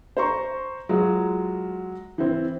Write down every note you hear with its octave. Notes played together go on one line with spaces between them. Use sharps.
C5 A#5 C#6
F#3 G#3 F4 F#4
E3 C4